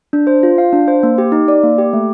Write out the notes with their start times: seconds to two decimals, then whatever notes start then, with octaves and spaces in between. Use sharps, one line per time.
0.13 D4
0.27 C5
0.43 F4
0.58 F5
0.73 D4
0.88 C5
1.03 A#3
1.18 G4
1.32 D#4
1.48 D5
1.63 A#3
1.78 G4
1.93 A3